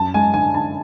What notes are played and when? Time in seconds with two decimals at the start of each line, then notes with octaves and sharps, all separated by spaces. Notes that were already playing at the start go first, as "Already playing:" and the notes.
Already playing: F#2 A5
0.14 G#3 G#5
0.34 D3 G#5
0.54 D3 A5